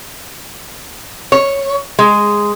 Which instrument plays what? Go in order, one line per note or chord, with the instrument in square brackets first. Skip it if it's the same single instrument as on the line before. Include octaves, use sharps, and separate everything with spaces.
[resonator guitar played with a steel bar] C#5
G#3